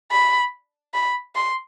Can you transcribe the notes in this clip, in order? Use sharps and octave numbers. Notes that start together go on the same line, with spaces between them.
B5
B5
C6